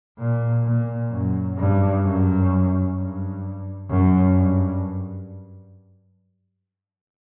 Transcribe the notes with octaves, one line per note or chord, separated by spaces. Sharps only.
A#2
A#2
F#2
G2
F#2
G2
F#2
G2